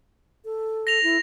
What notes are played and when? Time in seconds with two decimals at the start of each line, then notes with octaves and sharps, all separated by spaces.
0.45 A4
0.87 A#6 F7
1.03 E4